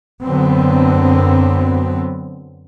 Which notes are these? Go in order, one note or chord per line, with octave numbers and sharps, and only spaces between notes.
F#2 D3 F#3 B3 C4